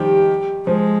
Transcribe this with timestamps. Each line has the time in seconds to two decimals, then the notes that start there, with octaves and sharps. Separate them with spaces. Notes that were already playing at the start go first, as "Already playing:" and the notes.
Already playing: D#3 F3 G3 G4
0.67 F3 G#3